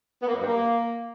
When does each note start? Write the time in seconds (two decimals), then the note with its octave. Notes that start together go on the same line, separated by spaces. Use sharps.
0.21 B3
0.27 A#3
0.34 F#2
0.40 G2
0.47 A#3